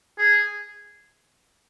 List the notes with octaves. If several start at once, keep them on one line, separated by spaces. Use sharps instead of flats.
G#4